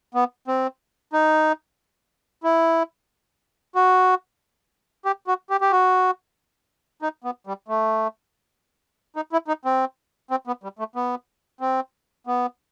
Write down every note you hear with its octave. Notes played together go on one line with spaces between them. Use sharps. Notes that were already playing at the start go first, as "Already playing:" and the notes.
B3
C4
D#4
E4
F#4
G4
F#4
G4
G4
F#4
D#4
B3
G3
A3
D#4
E4
D#4
C4
C4
B3
G3
A3
B3
C4
B3